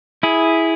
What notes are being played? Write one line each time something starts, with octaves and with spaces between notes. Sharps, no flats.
E4 G#4